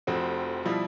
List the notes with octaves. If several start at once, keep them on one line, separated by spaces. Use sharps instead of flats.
F1 F2 C4 F#4
B2 F3 G3 E4